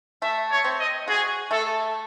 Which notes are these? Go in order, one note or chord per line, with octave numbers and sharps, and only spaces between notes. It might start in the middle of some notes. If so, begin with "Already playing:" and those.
A3 E5
C#5
C4
D#5
F#4 G#4
A3 A4